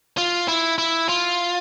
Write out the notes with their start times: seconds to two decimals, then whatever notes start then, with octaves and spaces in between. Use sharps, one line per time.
0.18 F4
0.48 E4
0.78 E4
1.09 F4